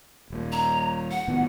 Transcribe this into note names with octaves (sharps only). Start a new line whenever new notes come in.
D#1 A#2
A#5
F#5
A2 D#3 B3